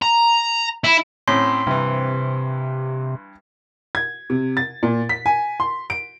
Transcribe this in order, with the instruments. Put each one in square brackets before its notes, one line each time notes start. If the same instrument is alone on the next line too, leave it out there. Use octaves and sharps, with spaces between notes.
[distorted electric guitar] A#5
E4
[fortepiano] A2 C4 C#4 [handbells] C6
[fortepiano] G2 E3 [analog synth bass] C3
[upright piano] G#6
C3
A6
A#2
B6
G#5
C6
D7